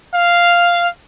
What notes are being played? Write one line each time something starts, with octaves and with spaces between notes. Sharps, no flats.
F5